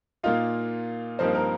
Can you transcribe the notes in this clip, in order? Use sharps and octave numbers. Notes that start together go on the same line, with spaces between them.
A#2 A#3 D#4 F4 F5
G2 F3 A#3 C4 D#4 C5
A#4